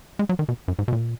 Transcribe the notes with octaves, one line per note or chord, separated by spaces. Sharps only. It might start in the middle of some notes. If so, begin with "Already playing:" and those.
G#3
F#3
D#3
B2
F#2
G#2
B2
A#2